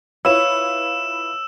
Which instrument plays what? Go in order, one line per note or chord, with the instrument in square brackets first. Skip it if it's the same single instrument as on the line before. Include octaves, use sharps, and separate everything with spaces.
[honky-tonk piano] E4 F4 B4 [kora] C#5 [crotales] E6 E7